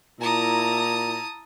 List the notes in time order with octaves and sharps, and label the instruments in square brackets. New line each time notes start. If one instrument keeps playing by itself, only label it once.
[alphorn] A#2 [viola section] E4 A#5 [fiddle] A5 D#6